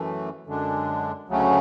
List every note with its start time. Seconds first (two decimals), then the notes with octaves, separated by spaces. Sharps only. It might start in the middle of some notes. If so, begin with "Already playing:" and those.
Already playing: F#2 E3 A3
0.47 F#2 D3 G#3 D4
1.29 D2 C#3 F#3 A3 C#4